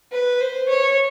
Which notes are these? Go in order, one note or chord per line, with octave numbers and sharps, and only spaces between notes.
B4
C5
C#5